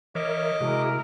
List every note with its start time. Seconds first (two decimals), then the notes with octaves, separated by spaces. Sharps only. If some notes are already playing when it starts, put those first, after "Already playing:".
0.15 E3 A#4 C#5 D#5 E5 D6
0.61 C3 G#3 E4 F#4 G#4 A#4